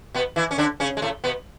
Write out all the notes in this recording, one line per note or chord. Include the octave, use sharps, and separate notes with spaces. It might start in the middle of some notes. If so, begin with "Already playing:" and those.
B2 B3
E3 E4
C#4
D3 D4
C#3 C#4
G#3
A2 A3
B2 B3